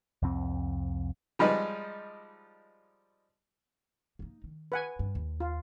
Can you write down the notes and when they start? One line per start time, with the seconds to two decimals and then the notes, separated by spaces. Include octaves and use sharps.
0.22 C2 F2 C4
1.39 F3 G3 G#3 D#4 B4
4.19 A#3 D#4
4.44 D#3
4.72 B4 F#5 G#5
4.99 G2
5.15 D#2
5.40 F4